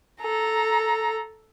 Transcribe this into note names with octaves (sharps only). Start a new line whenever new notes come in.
A4 A#5